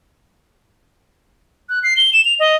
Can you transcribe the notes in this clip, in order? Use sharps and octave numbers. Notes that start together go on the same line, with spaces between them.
F#6
C7
G7
E7
F7
D#5